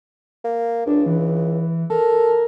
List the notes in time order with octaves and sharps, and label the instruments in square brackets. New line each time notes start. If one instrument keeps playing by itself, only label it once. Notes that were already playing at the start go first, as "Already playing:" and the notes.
[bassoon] A#3
[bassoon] C#2 [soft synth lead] D4
[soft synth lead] E3
[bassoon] A4 [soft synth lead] A#4